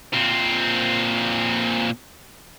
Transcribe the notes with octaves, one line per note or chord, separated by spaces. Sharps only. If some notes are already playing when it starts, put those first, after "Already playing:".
A#2 C4